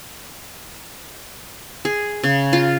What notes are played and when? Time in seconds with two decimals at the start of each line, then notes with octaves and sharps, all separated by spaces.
1.85 G#4
2.23 C#3
2.53 F4